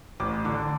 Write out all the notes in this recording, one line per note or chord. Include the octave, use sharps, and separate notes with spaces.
A1 D6
D3 D6